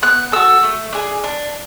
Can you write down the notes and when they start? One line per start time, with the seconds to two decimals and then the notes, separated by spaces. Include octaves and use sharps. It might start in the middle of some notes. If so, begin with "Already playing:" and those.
0.02 B3 F#6
0.32 F#4 A4 E6
0.63 A3
0.93 D4 G#4
1.24 D4